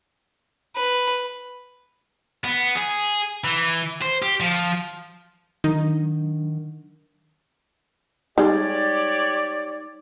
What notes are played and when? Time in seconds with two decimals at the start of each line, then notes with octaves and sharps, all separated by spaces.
0.76 B4
2.44 B3
2.75 G#4
3.44 E3
4.01 C5
4.22 G4
4.40 F3
5.64 D#3 F#3 D4 D#4
8.38 G3 G#3 D#4 G4 C#5 D5